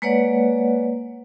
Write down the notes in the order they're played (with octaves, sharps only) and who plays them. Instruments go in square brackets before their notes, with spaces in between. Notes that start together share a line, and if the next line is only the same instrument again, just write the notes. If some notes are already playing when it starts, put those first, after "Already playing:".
[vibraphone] G#3 A#3 B4 C#5 D5 F#5